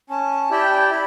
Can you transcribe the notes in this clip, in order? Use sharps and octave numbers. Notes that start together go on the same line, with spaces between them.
C#4 A5
E4 G4 D5 G5
E4 B5